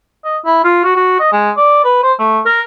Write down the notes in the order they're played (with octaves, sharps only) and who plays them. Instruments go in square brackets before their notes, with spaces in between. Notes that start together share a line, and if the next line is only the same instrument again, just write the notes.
[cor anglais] D#5
E4
F4
F#4
F#4
D#5
G#3
D5
B4
C5
A3
A#4